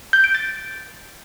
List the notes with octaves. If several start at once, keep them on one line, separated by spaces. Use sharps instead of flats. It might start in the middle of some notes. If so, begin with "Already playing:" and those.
G6
D7
A6